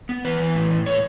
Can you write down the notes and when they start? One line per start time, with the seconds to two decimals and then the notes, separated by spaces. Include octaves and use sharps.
0.09 B3
0.25 E3 B4
0.40 E3
0.55 A2
0.71 A2
0.86 A2 C#5